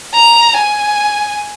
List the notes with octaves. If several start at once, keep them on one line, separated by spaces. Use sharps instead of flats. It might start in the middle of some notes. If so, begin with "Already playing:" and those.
A#5
G#5